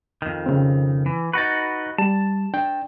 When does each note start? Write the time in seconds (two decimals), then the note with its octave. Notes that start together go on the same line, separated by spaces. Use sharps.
0.22 F2 D#3
0.46 C#3 C4
1.06 E3
1.33 D#4 F#4 B4 C#6 A6
1.98 G3 A5
2.54 D4 G5